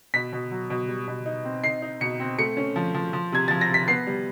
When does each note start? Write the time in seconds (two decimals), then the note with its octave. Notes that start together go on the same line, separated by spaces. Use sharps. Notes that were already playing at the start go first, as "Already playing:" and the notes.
0.14 B2 B6
0.33 B2
0.51 F#3
0.70 B2
0.88 G3
1.08 B2
1.26 D#4
1.45 C4
1.64 D#4 C7
1.82 D#4
2.01 B2 C#7
2.20 C4
2.39 A3 C#7
2.57 C#4
2.76 F3
2.94 F3
3.13 F3
3.32 C3 G#6
3.48 F3 A6
3.61 A#6
3.70 C3 B6
3.88 B3 C7
4.07 G3